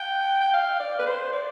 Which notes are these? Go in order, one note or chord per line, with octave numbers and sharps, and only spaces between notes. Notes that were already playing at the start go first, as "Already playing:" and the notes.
Already playing: G5
G5
F5
D5
B4
C5
D5